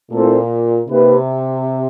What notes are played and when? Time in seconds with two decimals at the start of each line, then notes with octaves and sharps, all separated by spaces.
0.11 A#2 A3 C4 E4 A4 C5
0.88 C3 A#3 D#4 G4 B4